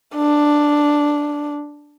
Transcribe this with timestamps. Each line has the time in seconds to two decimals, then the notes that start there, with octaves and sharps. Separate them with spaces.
0.15 D4